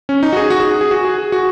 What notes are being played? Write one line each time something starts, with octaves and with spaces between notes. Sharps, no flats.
C#4
D#4
F#4
G#4
F#4
G#4
G#4
G#4
F#4
G#4
G#4
F#4